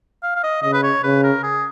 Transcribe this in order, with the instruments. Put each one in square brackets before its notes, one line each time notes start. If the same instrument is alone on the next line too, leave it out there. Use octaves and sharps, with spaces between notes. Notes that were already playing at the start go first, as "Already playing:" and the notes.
[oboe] F5
F5
D#5
[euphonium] C#3 [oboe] D#5
[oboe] B4
C#5
[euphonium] C#3 [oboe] B4
[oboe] A#4
G#4